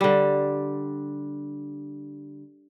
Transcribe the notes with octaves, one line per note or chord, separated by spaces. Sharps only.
D3 G3